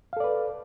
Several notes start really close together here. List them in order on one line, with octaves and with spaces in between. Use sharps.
F5 A4 D5 B4